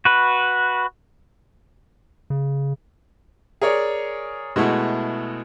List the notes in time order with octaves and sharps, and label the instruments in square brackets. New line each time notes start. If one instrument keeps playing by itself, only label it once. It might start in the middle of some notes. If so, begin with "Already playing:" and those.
[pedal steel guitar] F#4 B4
[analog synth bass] C#3
[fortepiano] G#4 A#4 C#5 D5
B2 G#3 A3 E4 F#4